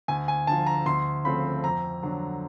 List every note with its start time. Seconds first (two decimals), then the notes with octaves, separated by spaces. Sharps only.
0.08 D2 G#5
0.28 G#5
0.47 D3 A5
0.51 F3
0.66 A#5
0.86 D2 C6
1.24 C#3 F3 A3 C4 B5
1.64 F2 A#5
2.03 D3 F#3